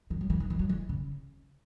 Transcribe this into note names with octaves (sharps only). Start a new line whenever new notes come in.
E3
F#3
E3
D#3
E3
F#3
E3
C#3